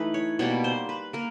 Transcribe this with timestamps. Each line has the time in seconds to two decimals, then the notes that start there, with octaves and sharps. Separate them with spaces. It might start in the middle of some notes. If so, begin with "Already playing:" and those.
Already playing: E3 A3 D#4 B4
0.14 C#5
0.39 B2 G3 A#3 C#5
0.64 C5
0.89 B4
1.13 A#3 A#4